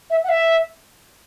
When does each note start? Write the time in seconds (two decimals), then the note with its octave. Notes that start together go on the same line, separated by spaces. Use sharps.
0.10 E5
0.24 F#5
0.29 E5